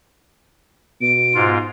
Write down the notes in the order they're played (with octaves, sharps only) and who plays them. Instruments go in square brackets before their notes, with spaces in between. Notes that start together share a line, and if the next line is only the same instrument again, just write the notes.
[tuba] B2 [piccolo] D7
[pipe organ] G#2 F4